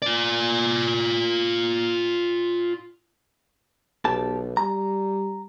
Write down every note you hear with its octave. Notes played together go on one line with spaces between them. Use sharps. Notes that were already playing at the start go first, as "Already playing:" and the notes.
F4 D5
B1 G4 A5
G3 A#5